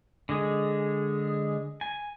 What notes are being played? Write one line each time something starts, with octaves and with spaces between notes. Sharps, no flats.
D3 G#3 G#4
G#5